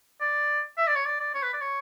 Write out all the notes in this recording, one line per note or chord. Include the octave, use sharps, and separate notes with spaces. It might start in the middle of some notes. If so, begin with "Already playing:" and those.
D5
E5
D5
C#5
D5
D5
C#5
B4
D5
C#5